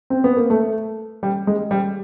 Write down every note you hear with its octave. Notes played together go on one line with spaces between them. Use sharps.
C4
B3
A#3
A3
G3
G#3
G3